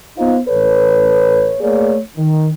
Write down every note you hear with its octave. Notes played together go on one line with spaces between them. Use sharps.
B3 D#4 F4 C5 F5
A1 A4 B4 C#5
A3 A#3 G#4 C#5 D5
D#3